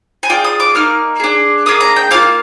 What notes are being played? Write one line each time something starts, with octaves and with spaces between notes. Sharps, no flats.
G#5
D4 F4 G#4 G5
D#6
D6
A#3 D#4 F6
D4 G#4
A#3 D4 G#4 D#6
A#5
G5
A#3 D4 F4 F5